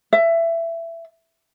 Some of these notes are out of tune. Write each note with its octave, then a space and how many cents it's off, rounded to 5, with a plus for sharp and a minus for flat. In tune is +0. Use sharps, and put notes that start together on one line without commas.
E5 +20